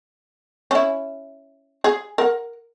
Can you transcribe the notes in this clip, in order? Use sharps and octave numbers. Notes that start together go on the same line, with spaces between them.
C#4 E4
G#4
A#4 F#5